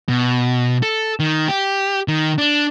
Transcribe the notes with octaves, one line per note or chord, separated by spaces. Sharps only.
B2
A4
D#3
G4
D#3
D4